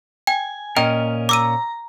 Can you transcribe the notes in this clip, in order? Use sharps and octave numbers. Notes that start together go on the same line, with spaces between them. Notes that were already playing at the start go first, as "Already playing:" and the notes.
G5 G#5
A#2 C#4 A#4 D#5 G5
A#5 D6 E6 D#7